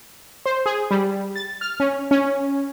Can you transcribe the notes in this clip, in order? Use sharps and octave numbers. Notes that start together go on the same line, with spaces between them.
C5
G#4
G3
A6
F6
C#4
C#4